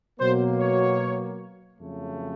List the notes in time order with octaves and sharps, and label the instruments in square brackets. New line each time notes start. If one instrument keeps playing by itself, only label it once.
[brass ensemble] B2 F#3 A#3 C5
C#5
F2 C#3 F#3 A3